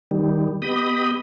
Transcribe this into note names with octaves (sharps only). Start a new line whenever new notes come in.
D#3 G3
B3 G4 D#5 B5 D#6